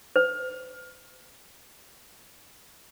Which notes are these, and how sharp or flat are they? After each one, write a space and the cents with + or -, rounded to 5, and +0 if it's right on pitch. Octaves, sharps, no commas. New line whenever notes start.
C5 -45